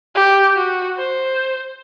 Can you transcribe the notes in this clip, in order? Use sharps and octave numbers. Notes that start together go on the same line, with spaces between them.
G4
F#4
C5